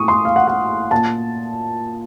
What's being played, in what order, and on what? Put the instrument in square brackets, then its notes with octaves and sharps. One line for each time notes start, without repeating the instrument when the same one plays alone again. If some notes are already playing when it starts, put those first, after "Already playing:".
Already playing: [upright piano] A2 C#6 D#6
C6
F5
F#5
F#5
A#2 A5